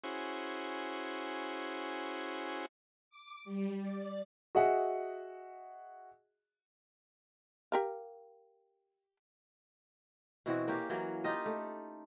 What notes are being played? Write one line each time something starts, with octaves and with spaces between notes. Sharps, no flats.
C#4 E4 F#4 G#4 C5
D6
G3
D5
F#4 G#4 D#5 E5 F#5
G4 A#4 F5
B2 E3 C4 F#4
A#3 C#4 G4
E3 F#3 A#3
D#4 F4 G4 D#5
A3